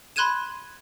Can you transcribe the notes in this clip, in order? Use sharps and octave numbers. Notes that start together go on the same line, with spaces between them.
B5 C6 F#6 G#6 D#7 E7